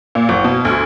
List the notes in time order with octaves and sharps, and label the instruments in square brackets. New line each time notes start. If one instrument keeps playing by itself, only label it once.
[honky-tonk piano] A#2
F#1
B2
D2